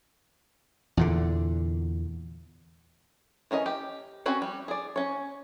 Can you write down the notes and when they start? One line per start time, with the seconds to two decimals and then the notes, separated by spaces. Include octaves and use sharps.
0.97 E2 A#2 D3
3.51 E3 C#4 A#4 D#5
3.66 G4
4.26 C4 C#4 F#4 C5 C#5
4.42 G3
4.68 G#4 D5
4.96 C#4 C#5